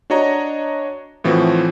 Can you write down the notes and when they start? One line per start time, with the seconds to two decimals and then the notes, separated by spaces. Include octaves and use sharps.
0.10 D4 F#4 C#5 D#5 A#5
1.24 A2 E3 F3 C4 F#4